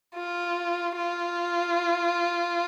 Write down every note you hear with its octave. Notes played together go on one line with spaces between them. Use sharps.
F4
F4